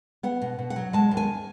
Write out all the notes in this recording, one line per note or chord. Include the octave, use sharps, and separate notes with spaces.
B3 F#5
B2
B2
F#5
F#3
G#3 A5
D#2
G#5